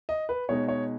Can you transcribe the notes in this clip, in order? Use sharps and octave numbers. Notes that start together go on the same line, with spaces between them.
D#5
B4
B2 G#3 D#4 C#5
C#5